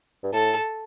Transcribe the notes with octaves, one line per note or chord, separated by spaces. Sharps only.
G2
A2 A4